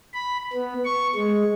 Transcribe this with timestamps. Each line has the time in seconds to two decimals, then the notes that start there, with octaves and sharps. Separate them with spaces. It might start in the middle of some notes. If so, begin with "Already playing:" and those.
0.14 B5
0.53 B3
0.85 C#6
1.15 G#3